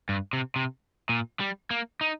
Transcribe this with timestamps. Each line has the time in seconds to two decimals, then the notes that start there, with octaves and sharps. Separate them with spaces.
0.09 G2
0.33 C3
0.56 C3
1.09 A#2
1.40 G3
1.71 A#3
2.01 D#4